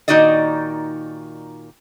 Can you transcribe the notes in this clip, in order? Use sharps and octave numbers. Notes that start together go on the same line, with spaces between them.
A#2 D#3 D#4 F#4 D5 D#5